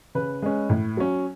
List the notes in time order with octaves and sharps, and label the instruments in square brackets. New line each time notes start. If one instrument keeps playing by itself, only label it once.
[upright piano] C#3 B4
G#3 C#4
A2
F#3 C#4